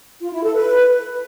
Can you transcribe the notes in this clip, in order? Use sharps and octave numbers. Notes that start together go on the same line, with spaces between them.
F4
E4
A4
B4